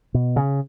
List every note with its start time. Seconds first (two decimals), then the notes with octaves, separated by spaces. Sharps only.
0.14 B2
0.36 C#3